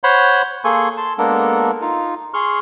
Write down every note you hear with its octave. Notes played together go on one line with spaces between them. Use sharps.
C5 C#5 F#5 B5 C6
A#3 G#4 A4 G#5 C6 C#6
A5 C6
G#3 A#3 B3 D4 A4 A#4
D#4 F4
G#4 C6 C#6 F6